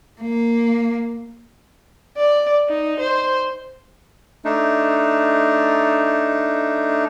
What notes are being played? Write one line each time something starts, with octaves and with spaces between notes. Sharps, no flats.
A#3
D5
D#4
C5
A3 D4 D#4